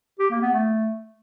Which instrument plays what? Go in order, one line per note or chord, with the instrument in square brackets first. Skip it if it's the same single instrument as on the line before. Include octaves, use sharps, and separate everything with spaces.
[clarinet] G4
A#3
B3
A3